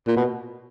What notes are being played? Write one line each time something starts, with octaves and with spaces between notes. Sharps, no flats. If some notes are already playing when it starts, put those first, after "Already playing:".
A#2
B2